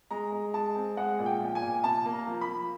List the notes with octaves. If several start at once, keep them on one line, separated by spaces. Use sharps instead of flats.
G#3 A#5
G#3
G#3 A5
C4
G#3 F#5
A#2
G5
F3
G#5
A#2
C3 A5
A#3
A#5
F3
B5
F3